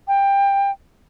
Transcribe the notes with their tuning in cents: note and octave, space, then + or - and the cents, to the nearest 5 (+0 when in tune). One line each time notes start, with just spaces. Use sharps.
G5 +20